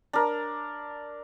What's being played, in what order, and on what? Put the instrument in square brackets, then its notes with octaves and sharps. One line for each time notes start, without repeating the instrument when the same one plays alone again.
[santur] D4 A#4